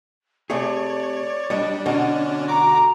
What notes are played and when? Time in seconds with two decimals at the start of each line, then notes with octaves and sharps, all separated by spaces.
0.50 C3 A3 G#4 C#5 D5
1.50 G3 D4 C#5 D#5
1.86 B2 D3 F#3 C#4 D4
2.48 F#4 A#5 D6